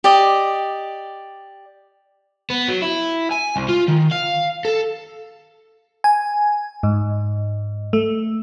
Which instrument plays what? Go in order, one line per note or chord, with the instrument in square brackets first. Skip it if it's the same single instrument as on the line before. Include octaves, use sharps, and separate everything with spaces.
[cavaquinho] G4 D5 D#5
[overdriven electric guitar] B3
F#3
E4
G#5
C2
F4
D#3
F5
A4
[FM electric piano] G#5
G#2
A3